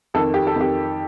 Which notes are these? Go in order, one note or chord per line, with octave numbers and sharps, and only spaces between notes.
F2 D#3 A4
G4
A4
F2 D#3 G4